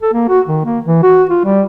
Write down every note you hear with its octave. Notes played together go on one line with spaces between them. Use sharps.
A4
A#3
F#4
D#3
A#3
E3
F#4
F4
G3